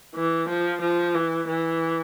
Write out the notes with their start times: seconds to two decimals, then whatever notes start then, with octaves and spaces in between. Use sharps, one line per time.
0.15 E3
0.49 F3
0.82 F3
1.15 E3
1.48 E3